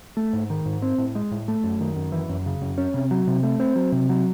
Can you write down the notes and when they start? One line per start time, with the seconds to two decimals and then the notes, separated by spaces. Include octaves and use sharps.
0.17 A3
0.33 G#2
0.50 D#3
0.66 G#2
0.82 C4
0.98 A2
1.15 G#3
1.31 A2
1.48 A3
1.63 F#2
1.80 D#3
1.96 F#2
2.12 E3
2.29 F#2
2.46 C#3
2.62 F#2
2.78 C#4
2.94 C3
3.11 F#3
3.27 C3
3.43 A3
3.60 C4
3.76 F#3
3.92 C3
4.09 F#3